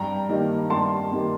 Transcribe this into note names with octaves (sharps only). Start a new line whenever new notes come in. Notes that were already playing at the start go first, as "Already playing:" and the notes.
Already playing: G2 G5 A#5
D#3 G3 A#3
G2 A5 C6
D#3 G3 A#3